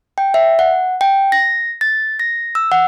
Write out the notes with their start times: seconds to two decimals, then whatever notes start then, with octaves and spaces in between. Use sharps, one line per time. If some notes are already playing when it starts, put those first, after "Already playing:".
0.18 G5
0.34 E5
0.59 F#5
1.01 G5
1.32 A#6
1.81 A6
2.20 A#6
2.55 E6
2.72 F#5